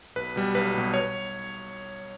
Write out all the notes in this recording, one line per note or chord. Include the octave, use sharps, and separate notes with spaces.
B1 B4
B2 G3
B1 B4
B2 G3
C#5